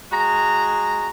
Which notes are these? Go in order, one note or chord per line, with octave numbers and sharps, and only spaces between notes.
G#3 F#4 A#5